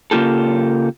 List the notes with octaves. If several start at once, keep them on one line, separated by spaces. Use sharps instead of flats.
C#3 A#3 F4 G4 A4